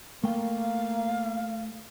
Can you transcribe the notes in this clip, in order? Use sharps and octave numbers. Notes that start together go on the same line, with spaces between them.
A3 A#3 F5 G5